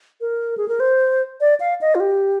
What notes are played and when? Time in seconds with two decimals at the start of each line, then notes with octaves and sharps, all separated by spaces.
0.21 A#4
0.58 G#4
0.68 A#4
0.80 C5
1.41 D5
1.60 F5
1.81 D#5
1.95 F4
2.00 G4